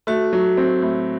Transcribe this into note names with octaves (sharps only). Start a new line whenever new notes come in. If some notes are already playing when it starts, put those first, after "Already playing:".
A3 F#4
F#3
C4
A2